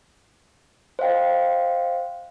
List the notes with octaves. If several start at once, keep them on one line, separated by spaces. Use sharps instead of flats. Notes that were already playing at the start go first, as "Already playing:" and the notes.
C5 D#5 F5 G5